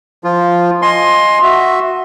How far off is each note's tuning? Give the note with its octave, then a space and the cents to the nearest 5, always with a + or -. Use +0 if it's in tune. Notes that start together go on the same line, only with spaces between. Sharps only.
F3 +0 F4 +0
D#5 +0 G#5 +0 C6 +15
F#4 +0 E5 +0